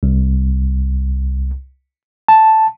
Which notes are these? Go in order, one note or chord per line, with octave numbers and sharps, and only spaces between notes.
C2
A5